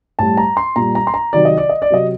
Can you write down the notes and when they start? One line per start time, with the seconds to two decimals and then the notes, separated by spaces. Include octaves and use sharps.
0.19 A2 G3 A5
0.37 A#5
0.57 C6
0.76 A#2 G3 A#5
0.95 A#5
1.07 C6
1.14 A#5
1.33 C3 D#3 F#3 D5
1.45 D#5
1.58 D5
1.69 D#5
1.82 D5
1.90 C3 F#3 D#5